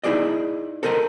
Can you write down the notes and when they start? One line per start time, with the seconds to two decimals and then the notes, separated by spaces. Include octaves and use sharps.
0.04 D#4 E4 F#4 G#4 D5 D#5
0.83 A4 A#4 C5 D#5 A#5